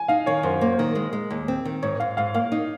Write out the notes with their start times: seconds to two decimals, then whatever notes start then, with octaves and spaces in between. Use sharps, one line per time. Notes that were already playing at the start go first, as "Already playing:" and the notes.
Already playing: G#5
0.08 D#4 F5
0.26 D#3 C#5
0.43 F#2 C5
0.61 A#3 C5
0.72 C5
0.78 D#3 A#4
0.95 G#3
1.13 G#3
1.31 D#2
1.48 C4
1.65 D#3
1.82 G#2 C#5
2.00 G#2 F5
2.17 G#2 F5
2.34 A#3 F5
2.52 D#4